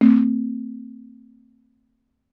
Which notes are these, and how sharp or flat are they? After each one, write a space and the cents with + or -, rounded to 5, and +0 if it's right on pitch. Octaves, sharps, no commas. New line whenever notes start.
A3 +40 C4 +0